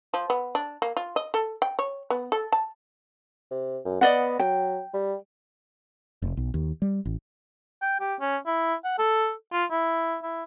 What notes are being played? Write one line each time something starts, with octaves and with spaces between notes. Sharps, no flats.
F3
B3
D4
A#3
F4
D#5
A4
G5
C#5
B3
A4
A5
C3
F#2
B3 D5 D#5 F#5
F#3 G5
G3
F1
B1
D#2
G3
A1
G5
G4
C#4
E4
F#5
A4
F4
E4
E4